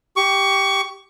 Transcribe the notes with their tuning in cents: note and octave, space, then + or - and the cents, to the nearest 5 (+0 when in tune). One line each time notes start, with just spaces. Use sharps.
G4 -5 C#6 +20